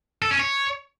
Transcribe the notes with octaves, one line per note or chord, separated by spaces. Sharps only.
A4
C#4
C#5